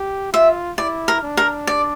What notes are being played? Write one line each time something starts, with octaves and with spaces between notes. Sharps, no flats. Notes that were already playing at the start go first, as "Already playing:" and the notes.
Already playing: G4
F4 E5
E4 D5
A#4
D4
A#4
D5